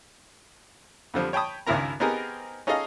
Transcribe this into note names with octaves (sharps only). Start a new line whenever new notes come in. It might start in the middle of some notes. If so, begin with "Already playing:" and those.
F2 D3 F3 G3
C#5 G5 A5 B5 D#6
C#2 G2 D#3 E4 A#4 A#5
B3 C4 D#4 G4 G#4 A#4
C#4 D#4 G#4 A4 D#5 F5